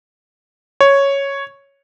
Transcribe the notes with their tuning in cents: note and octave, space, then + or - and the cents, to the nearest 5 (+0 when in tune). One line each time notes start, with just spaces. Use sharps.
C#5 +0